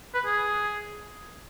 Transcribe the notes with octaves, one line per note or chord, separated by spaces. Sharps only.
B4
G#4